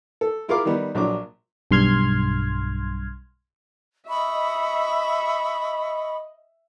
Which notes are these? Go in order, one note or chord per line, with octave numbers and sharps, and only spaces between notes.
A4
E4 F4 G#4 A#4 F5 D6
D#3 G3 B3 D#4
A#1 F#3 D4 D6
B1 G2 C6 F6 G#6
D#5 E5 B5 C#6 D#6